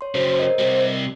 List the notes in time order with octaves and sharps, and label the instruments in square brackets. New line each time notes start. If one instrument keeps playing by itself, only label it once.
[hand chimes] C#5 C6
[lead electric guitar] C#3 F#3 [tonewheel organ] C5 [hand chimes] C#5
[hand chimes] A#4 D#5
[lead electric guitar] C3 G3